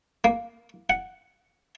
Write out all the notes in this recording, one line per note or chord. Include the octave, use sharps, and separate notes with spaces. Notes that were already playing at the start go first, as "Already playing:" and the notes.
A#3
F#5